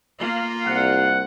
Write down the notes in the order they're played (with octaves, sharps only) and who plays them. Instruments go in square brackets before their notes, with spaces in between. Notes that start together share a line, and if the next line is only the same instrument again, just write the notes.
[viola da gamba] A#3 F4
[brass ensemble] C2 F#5